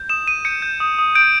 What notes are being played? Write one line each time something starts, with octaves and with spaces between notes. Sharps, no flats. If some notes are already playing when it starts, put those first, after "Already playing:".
Already playing: G6
D#6 E7
D#6 D#7
G6 C#7
G6
D#6
D#6
G6 D7